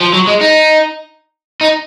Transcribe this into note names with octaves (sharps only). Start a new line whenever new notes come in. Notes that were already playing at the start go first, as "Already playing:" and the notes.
F3
F#3
G#3
D#4
D#4